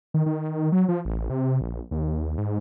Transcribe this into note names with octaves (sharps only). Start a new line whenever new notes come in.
D#3
D#3
F#3
F3
A1
C3
A#1
D#2
G#2